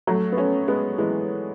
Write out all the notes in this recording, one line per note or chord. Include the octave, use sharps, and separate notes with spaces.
F#3 A3
B3
A3 C#4
G#3 B3
E3 G#3